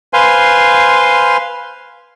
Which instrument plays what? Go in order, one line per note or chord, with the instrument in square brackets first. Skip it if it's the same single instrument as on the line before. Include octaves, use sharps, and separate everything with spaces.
[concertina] B4 C5 F5 G#5 C6